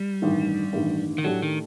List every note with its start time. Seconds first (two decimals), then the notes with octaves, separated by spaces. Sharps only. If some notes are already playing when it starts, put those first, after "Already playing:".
Already playing: G3
0.22 A1 G2 D#3
0.73 A1 G2 D#3
1.18 D#3
1.24 A2 F#3 A3 D4 G4
1.42 D#3